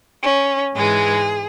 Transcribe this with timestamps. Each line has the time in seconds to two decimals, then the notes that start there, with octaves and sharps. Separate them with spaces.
0.22 C#4
0.75 G#2 E3 G#3 G#4